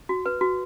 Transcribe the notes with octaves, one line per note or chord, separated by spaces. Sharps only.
F#4
B4
F#4